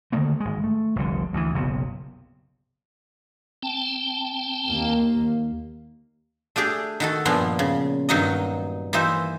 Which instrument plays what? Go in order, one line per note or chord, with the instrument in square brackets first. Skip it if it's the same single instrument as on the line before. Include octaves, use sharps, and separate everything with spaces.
[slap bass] D3 D#3 A3 A#3
G#1 G#3
A3
F1 C2 D3
D2 C#3 E3
F#1 B1 C3
[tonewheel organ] C4 G5 A5
[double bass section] D#2 A#3
[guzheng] A3 D4 G4 G#4
D#3 F#4 A4
G2 A#2 F3 A#3 B3
C#3
G2 D#3 F#3 D#4 F#4 D#5
E3 A#3 D#4 C5 E5